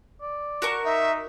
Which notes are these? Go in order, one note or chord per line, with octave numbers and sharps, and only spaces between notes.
D5
F#4 A#4 C#6
D#4 E5